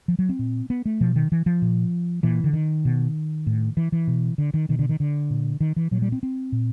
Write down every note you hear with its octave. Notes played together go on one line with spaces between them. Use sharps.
F3
F#3
C4
A#2
B3
A3
B2 F3
D#3
E3
F3
A#2
A#2 E3
D3
D#3
B2
A2
E3
E3
B2
D3
D#3
B2 D#3
D3
D#3
D3
A#2
D#3
E3
A#2 F#3
G3
C4
C4
A#2